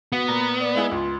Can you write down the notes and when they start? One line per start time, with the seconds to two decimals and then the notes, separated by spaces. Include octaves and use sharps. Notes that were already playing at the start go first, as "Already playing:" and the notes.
0.12 B3 F#4
0.28 A#2 A#5
0.60 D5
0.75 G#3 E4 G#4
0.91 C#2 F4